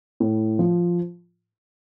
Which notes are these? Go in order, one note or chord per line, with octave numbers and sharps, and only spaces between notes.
A2
F3